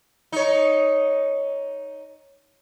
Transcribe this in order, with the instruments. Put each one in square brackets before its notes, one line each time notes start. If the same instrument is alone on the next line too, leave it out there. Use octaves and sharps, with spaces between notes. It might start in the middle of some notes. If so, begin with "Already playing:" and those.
[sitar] D#4 C#5